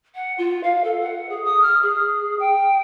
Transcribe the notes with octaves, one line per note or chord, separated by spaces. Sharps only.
F#5
F4
F5
A4
F#5
G#4
D#6
F6
G#4
G5